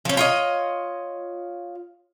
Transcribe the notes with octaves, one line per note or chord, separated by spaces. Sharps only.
F3 C#4
F4 C#5 D#5